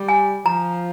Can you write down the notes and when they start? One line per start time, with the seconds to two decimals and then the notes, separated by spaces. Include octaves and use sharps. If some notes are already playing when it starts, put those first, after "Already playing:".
Already playing: G3
0.09 G#5
0.46 F3 A#5